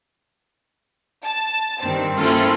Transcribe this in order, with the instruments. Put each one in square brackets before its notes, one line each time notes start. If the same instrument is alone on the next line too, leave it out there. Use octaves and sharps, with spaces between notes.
[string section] A5
G2 D#3 C4
A#3 C4 C#4 E4 F4 A4